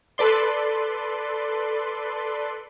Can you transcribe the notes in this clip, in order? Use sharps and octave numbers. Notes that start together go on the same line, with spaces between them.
A4 B4 D5 C6